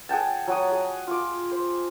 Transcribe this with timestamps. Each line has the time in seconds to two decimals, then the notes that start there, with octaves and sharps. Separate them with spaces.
0.09 G#4 F#5 G5 A5
0.48 F#3 F#4 D#6
0.72 G#4
1.07 F4 D6
1.51 C5